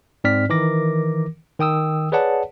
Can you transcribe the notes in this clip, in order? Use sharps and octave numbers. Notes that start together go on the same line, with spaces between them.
G#2 C4 D5 F6 B6
D#3 E3 A#4 D6 A#6
D#3 G5 D#6 E6
G#4 B4 C#5 D5 F#5 A5